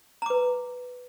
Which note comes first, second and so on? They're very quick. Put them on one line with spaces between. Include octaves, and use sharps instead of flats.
A#5 D6 B4